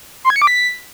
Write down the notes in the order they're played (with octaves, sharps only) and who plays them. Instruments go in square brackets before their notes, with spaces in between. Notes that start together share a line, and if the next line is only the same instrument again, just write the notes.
[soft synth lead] C6
G#6
C#7
D6
B6